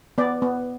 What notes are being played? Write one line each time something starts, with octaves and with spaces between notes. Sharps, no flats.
B3 D5
B3